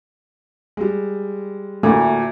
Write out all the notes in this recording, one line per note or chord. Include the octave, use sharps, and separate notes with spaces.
G3 G#3
D2 A#2 A3